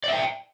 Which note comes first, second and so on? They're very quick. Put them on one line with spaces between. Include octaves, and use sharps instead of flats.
D5 E5 G5